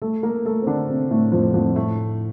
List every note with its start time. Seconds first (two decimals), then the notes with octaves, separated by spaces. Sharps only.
0.02 A3 A4
0.23 A#3 A#4
0.45 A3 A4
0.62 C4
0.67 D3 D4
0.88 C3 C4
1.10 A2 A3
1.32 F2 F3
1.54 F2 F3
1.75 A2 A3